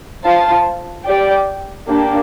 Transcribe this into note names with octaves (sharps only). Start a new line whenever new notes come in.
F4 C5 F5 A5
G4 D5 G5
A#3 D4 G4